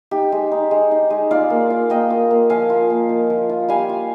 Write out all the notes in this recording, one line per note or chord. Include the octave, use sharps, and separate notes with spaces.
D#4 G4
G#3
D#4
G#3
D#4
G#3
F4 D5 F5
A#3
F4
A#3 D#5 G5
F4
A#3
F3 F5 G#5
F4
A#3
F3
F3
F4
G3 F5 G#5
F4